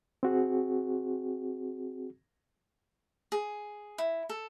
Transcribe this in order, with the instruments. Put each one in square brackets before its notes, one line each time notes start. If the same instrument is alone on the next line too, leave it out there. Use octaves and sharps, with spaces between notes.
[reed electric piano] C4 F#4 G#4
[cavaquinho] G#4
E4
A4